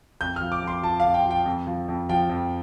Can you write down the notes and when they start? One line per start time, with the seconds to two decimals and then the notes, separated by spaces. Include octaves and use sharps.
0.21 F2 G6
0.36 F3 F6
0.52 D6
0.62 F2
0.67 C6
0.83 F3 A5
1.00 F5
1.05 F2
1.14 G5
1.25 F3
1.31 G5
1.45 F2
1.67 F3
1.88 F2
2.09 F3 G5
2.29 F2